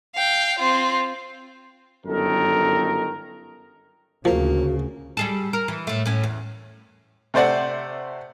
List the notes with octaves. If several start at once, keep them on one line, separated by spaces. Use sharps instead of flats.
F5 G5
C4 F4
G1 F#2 D#3 A4 A#4
D2 C#3 F3 A#3 F#4
G3 G#4 A4
A#4
E3
A2 A3
A2 C#4
E2
C3 A3 C5 D5 F#5